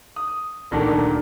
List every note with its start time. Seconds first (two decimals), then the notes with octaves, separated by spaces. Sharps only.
0.16 D#6
0.71 D1 A#2 D#3 D4 A4 A#4